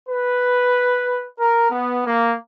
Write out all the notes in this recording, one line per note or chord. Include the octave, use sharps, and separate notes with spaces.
B4
A#4
B3
A#3